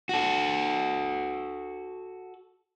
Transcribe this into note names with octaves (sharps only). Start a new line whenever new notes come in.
F#4 A4